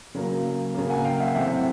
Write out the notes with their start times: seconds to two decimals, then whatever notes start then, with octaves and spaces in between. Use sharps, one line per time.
0.15 C#3 F#3 A#3
0.75 C#3 F#3 A#3
0.89 F#5 G#5
1.04 F5 G5
1.20 E5 F#5
1.35 C3 E3 A3 C4 E5 F#5